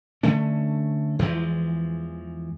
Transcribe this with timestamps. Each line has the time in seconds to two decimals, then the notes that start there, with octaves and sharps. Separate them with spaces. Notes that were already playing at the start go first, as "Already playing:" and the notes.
0.23 D3 A3 C#4
1.19 E2 E3 F3 G#3